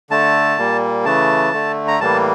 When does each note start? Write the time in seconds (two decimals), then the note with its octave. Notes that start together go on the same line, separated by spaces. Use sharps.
0.10 D3 A3 A5
0.57 A#2 G3 A#3
1.05 C#3 E3 A3 A5
1.53 D3 A3
1.88 A#5
2.00 A2 E3 G3 A#3 A5